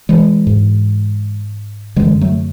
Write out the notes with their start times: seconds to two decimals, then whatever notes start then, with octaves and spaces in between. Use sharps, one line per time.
0.09 E3 G#3
0.47 G#2
1.96 F#2 D3 E3 G#3
2.21 F#3 A3